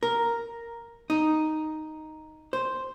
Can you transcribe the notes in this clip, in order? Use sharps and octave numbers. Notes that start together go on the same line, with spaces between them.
A#4
D#4
C5